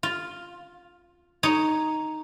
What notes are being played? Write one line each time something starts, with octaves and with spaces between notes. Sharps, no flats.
F4
D#4 C#5